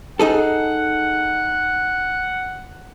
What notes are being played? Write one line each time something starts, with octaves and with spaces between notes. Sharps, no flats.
D#4 G#4 A4 F#5